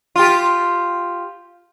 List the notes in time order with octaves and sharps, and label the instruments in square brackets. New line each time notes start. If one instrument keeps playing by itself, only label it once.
[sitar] F4 G4